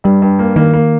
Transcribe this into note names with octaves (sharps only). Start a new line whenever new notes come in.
G2 G3
G2
A#3
D#3 A#3
A#3